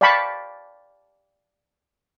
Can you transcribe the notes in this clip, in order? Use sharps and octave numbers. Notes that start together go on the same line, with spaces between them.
D5 F5 G5 A5 B5 C#6